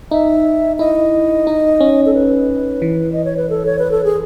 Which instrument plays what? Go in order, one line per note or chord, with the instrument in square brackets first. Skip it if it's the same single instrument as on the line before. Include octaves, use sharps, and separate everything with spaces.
[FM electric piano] D#4 [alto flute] E5
[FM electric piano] E4 [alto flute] D#5
[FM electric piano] D#4
C#4
[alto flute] A4
B4
[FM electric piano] E3
[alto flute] D#5
C#5
B4
A4
C#5
B4
A4
G#4